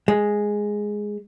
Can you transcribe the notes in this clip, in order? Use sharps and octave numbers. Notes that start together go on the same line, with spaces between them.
G#3